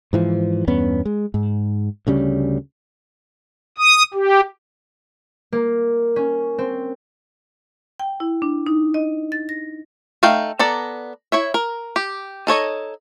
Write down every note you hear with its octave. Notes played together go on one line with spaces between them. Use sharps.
G#2 E3 F3
E2 G2 B3 C#4
G#3
G#2
D2 C#3 G3 C#4
D#6
G4
A#3
C#4
C4
G5
E4
D4
D#4
D#5
A6
A#6
A3 D#4 F5 G5
B3 A4 D5 A#5
E4 C#5 E5
A#4
G4
D#4 A4 C#5 D#5